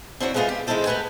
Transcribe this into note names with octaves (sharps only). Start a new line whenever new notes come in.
C4 D4 E4 F#4 A#4 C#5
G#3 A3 B3 D#4 F4 G#4
G4
D#3 G#3 C4 E4 A4 C5
A3 G4 A#4 B4 F#5 G#5